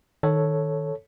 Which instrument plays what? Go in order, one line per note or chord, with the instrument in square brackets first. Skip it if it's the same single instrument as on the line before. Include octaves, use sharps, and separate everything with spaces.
[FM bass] D#3 [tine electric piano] A4 C#5